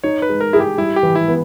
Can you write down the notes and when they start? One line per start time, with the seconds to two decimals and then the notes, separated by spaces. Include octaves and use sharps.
0.03 D#4 C#5
0.22 B4
0.29 G#3
0.41 A#4
0.53 E4 G#4
0.60 G4
0.78 G3 E4
0.96 G4
1.03 E3
1.15 E4
1.28 B3